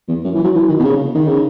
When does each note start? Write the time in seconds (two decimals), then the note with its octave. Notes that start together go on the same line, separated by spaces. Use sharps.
0.08 E2
0.24 F#2
0.34 E3
0.43 F#3
0.55 E3
0.68 D#3
0.79 B2
0.84 C#3
1.14 D#3
1.27 C#3